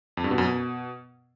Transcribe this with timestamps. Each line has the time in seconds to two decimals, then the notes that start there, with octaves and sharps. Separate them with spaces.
0.17 F2
0.24 G2
0.31 B2
0.38 F#2
0.45 B2